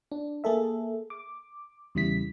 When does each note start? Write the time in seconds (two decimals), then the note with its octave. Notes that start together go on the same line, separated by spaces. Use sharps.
0.12 D4
0.44 A#3 G#4 A4 E5
1.10 D6
1.95 E2 C#3 G3 E4 B6